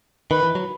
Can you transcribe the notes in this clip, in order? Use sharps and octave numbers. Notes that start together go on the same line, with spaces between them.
D#3 B4
E3
F#3